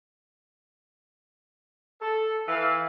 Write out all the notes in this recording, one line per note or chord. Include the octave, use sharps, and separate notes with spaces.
A4
E3 F5